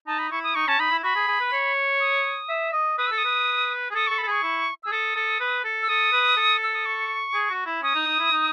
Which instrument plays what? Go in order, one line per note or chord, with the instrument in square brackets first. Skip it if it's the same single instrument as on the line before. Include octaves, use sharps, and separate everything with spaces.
[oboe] D#4 [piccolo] A5
[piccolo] B5
[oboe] E4 [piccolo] C#6
[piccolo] D#6
[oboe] D#4 [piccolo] C#6
[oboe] C#4 [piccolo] A5
[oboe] D#4 [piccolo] B5
[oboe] E4
[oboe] F#4 [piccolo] B5
[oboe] G#4
G#4
B4
C#5
[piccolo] D#6
[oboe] E5
D#5
[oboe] B4 [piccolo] D#6
[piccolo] E6
[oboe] A4
[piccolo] D#6
[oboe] B4
G#4
[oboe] A4 [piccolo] D#6
[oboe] A4 [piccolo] C#6
[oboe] A4 [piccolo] B5
[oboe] G#4 [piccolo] C#6
[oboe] E4
[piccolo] E6
[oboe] G#4
[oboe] A4 [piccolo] D#6
[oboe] A4
B4
A4
[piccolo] E6
[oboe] A4 [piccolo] D#6
[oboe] B4
A4
[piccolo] E6
D#6
C#6
[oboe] G#4
F#4
E4
[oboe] C#4 [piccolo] D#6
[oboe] D#4
D#4
E4
D#4